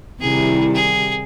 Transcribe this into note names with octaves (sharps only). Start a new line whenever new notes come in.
C3 D#3 G3 E4 G#4
G#4